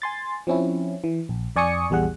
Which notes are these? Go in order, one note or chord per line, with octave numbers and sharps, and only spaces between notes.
G#5 C6 A6
F3 C4 C#4 E4
E3
A#1
F2 D5 G#5 C#6 D#6 C#7
A#1 E2 G3 G#4 F#5